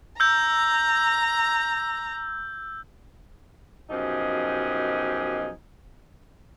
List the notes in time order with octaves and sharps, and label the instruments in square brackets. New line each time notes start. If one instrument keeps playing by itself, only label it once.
[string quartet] A#5 [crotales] E6 G6
[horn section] F#2 B2 F3 D#4 G4 G#4